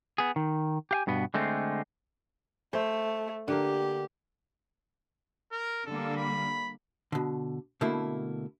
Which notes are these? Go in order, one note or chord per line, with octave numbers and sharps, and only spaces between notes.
B3 G#4
D#3
G4 F5 G#5
G2 B2 B3
D3 G#3 A3 C4
A3 C5
D3 A#3 G4
A#4
D3 G3 A#3 A4
B5
B2 D3
B2 D3 A3 A#3 E4